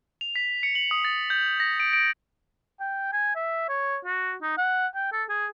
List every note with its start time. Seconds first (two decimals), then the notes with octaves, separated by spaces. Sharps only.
0.21 F7
0.36 B6
0.63 C#7
0.75 F#7
0.91 D#6
1.04 A6
1.30 G6
1.60 A#6
1.80 D7
1.93 D7
2.80 G5
3.13 G#5
3.35 E5
3.69 C#5
4.05 F#4
4.42 D#4
4.58 F#5
4.95 G5
5.12 A4
5.29 G#4